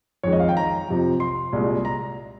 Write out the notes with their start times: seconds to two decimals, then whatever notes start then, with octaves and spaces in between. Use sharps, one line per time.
0.23 F2 D#3 G#3 C#5
0.33 D#5
0.40 F5
0.49 G5
0.57 A#5
0.89 F2 C3 F3
1.20 C6
1.53 C2 A#2 G#3
1.85 A#5